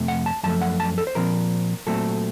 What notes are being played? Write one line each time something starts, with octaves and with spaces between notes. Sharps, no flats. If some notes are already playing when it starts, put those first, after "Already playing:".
Already playing: F2 C3 F3 A3
F#5
A5
F#2 F3 A3 A5
F#5
A5
A4
C5
A#2 F3 C4 A#4
A#2 F#3 A3 C4 A4